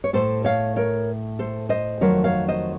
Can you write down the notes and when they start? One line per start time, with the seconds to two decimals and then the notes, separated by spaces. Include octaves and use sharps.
0.04 C#5
0.13 A2 A3 A4 C5
0.44 C#5 F5
0.76 A#4 C#5
1.39 A4 C5
1.69 C5 D#5
2.01 F2 D#3 F#3 A3 A#4 C#5
2.24 C#5 F5
2.48 C5 D#5